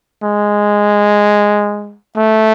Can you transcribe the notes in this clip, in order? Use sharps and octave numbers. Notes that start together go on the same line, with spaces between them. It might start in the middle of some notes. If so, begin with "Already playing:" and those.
G#3
A3